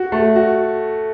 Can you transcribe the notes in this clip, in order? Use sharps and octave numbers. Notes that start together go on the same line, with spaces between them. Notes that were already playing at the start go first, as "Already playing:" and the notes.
Already playing: F#4
A3
F#4